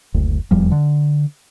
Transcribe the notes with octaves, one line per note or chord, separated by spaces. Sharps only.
F#1 D2
D#1 E2 F3 G3
D3